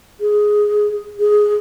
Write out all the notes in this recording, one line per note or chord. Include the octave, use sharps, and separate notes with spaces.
G#4
G#4